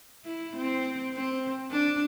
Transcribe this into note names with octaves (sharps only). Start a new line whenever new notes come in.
E4
C4
C4
D4